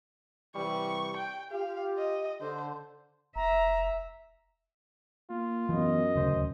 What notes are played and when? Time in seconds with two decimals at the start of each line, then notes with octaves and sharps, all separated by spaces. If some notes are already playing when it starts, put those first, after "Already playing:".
0.55 C3 E3 G3 C#6
1.17 G5
1.52 F4 G4 F5
1.98 D#5
2.41 D3 C5
3.36 F1 E5 A#5
5.30 A#3 F4
5.69 F#2 E3 B3 D#5
6.16 D#1 D2 C#3 C5